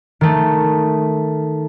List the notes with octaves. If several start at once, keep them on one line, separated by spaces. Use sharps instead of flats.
D#3 A3